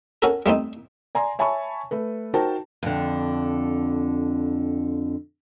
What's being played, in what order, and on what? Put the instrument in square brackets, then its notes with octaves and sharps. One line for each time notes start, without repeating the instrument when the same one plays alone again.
[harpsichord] C#4 F#4 A4 A#4
G3 A3 C4 D#4
[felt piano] D5 G#5 A#5 C6
C#5 E5 G#5 A5 B5 C#6
A3 A4 B4
D#4 F#4 A#4 C5 G5 A5
[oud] F2 D3